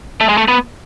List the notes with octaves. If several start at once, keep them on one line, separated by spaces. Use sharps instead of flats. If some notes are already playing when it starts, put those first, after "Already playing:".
A3
G#3
A3
B3